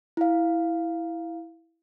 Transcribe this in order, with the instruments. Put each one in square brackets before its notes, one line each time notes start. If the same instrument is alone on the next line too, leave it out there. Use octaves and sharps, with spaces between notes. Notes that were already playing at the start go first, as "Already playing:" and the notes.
[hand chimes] E4 F5